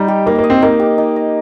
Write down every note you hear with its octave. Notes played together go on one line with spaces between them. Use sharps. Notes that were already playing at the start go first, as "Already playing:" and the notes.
Already playing: G3 D#4
G4
A#3 D#4
A#3
D#5
C4
A#3 D#4
G4
D#4
D#5